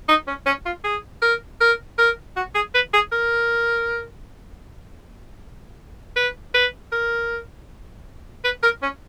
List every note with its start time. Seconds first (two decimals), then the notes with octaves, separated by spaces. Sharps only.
0.09 D#4
0.27 C#4
0.46 C#4
0.66 F4
0.84 G#4
1.22 A#4
1.61 A#4
1.98 A#4
2.36 F#4
2.55 G#4
2.74 B4
2.93 G#4
3.12 A#4
6.16 B4
6.54 B4
6.92 A#4
8.45 B4
8.63 A#4
8.82 C#4